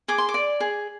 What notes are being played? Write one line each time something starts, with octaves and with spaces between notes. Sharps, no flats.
G#4 D6
C6
D6
D5
G#4